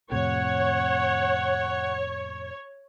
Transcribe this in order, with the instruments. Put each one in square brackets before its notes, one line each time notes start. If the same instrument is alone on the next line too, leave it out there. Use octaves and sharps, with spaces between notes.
[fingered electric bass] F2 A2 C3 [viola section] C#5 [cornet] F#5